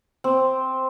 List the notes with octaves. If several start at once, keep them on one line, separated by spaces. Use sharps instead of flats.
C4